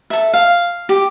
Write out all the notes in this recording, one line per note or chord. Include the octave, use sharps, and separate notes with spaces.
A4 E5
F5
G4